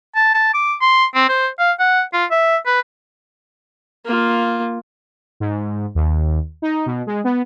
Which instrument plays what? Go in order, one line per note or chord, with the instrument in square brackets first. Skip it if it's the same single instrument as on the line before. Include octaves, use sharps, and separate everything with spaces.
[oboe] A5
A5
D6
C6
C4
C5
F5
F#5
F4
E5
B4
[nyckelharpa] A#3 F4
[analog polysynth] G#2
D#2
D#4
B2
G#3
B3